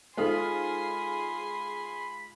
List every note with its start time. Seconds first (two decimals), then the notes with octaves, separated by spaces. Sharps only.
0.17 G#3 D#4 F4 G#4 A4 C5 B5 C6